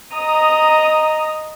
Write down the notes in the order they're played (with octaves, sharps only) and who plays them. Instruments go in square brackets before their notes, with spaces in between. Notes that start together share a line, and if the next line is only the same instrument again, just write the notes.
[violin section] D#5 A#5 D#6